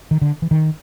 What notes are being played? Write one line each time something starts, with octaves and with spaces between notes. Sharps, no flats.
D#3
D3
E3
D#3